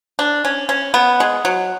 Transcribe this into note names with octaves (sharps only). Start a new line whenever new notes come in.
D4
C#4
C#4
B3
G#3
F#3